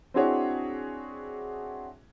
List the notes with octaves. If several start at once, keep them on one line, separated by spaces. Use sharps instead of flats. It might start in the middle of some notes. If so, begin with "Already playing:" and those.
C4 D4 E4 F#4 G#4 C#5